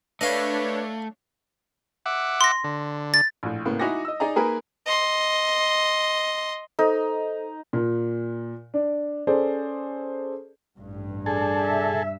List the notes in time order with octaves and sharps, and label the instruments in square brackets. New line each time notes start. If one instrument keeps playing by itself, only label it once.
[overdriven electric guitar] A3 [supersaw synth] D4 C#5 [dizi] B4 [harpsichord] D#5 F5
[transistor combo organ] E5 F#5 D6
[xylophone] C6 A#6
[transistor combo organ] D3
[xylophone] A6
[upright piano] A#1 A2
A2 C#3 A#3 B3
D#4 E4 F#4 G#5 D6 A#6
D#5 E6
D#4 G#4 D5 D#5 A#5
A#3 D#4 G#4 A#4 B4
[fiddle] D#5 C6
[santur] D#4 [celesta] A4 C5 D#5
[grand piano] A#2
D4 D5
C#4 G#4 A4 C5 D5
[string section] A1 [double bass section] G2
[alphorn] D4 [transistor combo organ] G#4 A4
[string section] E5